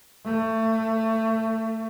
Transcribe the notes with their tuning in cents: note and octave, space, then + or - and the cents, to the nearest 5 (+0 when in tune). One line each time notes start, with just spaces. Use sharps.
A3 +25